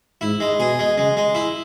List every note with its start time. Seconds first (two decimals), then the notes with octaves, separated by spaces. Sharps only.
0.21 G#2 E4
0.40 G#3
0.60 B2 G#4
0.79 G#3
0.97 C#3 G#3
1.17 G#3
1.35 E4